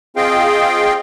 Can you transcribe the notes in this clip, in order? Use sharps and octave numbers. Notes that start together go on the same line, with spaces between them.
C4 F4 G#4 D#5 F5 G5